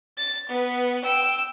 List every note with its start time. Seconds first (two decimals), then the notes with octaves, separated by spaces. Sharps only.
0.18 A6
0.49 B3 B4
1.04 G5 E6